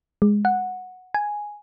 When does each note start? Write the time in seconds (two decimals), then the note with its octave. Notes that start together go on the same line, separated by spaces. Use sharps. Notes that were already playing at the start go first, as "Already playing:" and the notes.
0.22 G#3
0.45 F#5
1.14 G#5